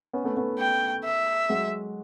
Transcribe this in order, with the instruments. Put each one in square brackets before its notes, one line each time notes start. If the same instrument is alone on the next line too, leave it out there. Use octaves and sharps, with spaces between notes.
[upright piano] B3 C#4
A3 B3
A3 B3
[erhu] G5
E5
[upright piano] F#3 G#3